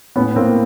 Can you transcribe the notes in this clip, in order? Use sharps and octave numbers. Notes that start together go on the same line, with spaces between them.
A2 B3 C#4
A#3 C4